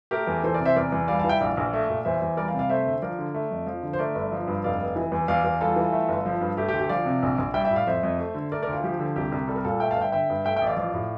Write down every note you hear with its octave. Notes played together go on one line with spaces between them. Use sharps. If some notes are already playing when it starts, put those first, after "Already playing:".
A3 G4 A#4
E2
E3 A4 C5
A#4 D5
C3
C5 E5
E2 A#4 D5
E2
G3 D5 F5
E3 F5 A5
E5 G5
A#1 D5 F5
A#1
A3
A#2
E2 C5 E5
E2
G3 A#4 D5
D5 F5
C3
D5 F5
A3 C5 E5
D2
F3 A#4 D5
D3
A3
F2
F3
D3
C5
A3 A#4 D5
G1
F3
G2
F1 D5 F5
F1
E3
E2
E2 D5 F5
E2
G3 F4 A4
E3
A3
G1
F3
G2
A3 G4
G4
D2
G4
F3 D5 F5
C3
A#1
A#1
G3 E5 G5
E5 G5
A2
D5 F5
F2 C5 E5
F2
A3
D3
A3 A#4 D5
A#4 D5
D2
F4
F3 G4
D3
C2 G4
C2
G3 A4
A#4
A#2 F4 A4
A3 E5 G5
F5 A5
G1
E5 G5
D3 E5 G5
G2
A3 E5 G5
E5 G5
A1
D5 F5
F3 D5 F5
A2